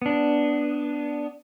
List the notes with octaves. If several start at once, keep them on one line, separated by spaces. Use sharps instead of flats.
B3 D4